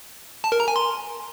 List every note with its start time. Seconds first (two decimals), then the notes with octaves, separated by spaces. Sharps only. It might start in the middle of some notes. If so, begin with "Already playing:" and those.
0.44 A5
0.52 A#4
0.60 A#5
0.68 G#5
0.76 C6